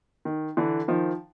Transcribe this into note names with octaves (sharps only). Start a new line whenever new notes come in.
D#3
D3 E3
D#3 F3